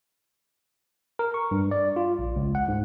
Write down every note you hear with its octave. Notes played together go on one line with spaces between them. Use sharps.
A#4
C#6
G2
D5
F4
A#1
C#2
F#5
G#2